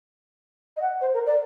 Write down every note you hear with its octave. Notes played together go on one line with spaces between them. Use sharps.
D#5
F#5
C5
A#4
D5